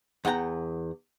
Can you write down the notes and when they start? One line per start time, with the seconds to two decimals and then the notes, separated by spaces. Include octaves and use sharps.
0.25 E2 F#5 G5 A5 A#5